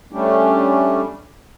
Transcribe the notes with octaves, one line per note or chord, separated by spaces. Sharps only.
G3 A3 C#4 D4 G4